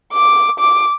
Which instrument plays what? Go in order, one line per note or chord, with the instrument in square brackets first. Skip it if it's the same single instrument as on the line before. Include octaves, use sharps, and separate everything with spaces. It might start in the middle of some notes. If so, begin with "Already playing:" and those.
[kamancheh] D6
D6